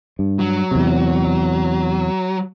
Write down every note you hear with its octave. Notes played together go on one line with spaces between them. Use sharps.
G2
F#3
E2 C3